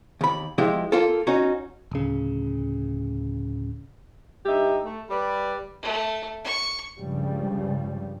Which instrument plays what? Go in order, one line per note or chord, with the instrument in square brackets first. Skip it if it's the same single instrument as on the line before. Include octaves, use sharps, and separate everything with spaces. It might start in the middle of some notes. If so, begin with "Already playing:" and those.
[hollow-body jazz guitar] D#2 B5
F3 G#3 E4 G4
A#3 F4 A4
C#4 D#4 F#4
[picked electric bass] D1 C#3
[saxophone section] G2 D#4 G4 E5
A3
G3 B4 D5
[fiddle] A3
C#6
[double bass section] C#2 G2 C#3 F3 G3